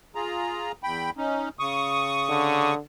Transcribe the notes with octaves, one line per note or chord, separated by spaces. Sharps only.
F4 G#4 A#5
E2 G5 B5
C#4 D#4
C#3 C#6 D#6
D3